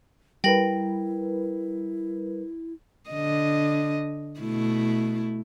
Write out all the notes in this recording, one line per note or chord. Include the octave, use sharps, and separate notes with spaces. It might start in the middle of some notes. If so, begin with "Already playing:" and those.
G3 E4 A#4 B4 G5 A#6 F#7
D3 D#5
B2 A3 E4